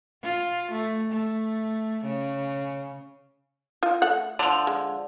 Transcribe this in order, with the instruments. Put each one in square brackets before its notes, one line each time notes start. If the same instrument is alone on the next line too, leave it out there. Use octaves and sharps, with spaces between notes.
[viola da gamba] F4
A3
A3
C#3
[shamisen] F4
A3 F#5
[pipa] D3 F3
[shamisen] G#3